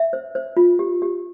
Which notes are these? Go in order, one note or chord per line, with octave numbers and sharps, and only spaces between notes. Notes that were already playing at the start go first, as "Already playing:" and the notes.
Already playing: E5
C5
C5
F4
G4
G4